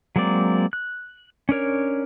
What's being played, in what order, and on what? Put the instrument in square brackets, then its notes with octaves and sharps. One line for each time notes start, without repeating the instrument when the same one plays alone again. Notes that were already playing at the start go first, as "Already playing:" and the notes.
[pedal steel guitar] F#3 G#3 A#3 C4 D5
F#6
C#4 D4 A#4 C#5